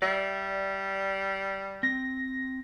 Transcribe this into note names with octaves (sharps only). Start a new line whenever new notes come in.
G3 D5 E5
C4 A#6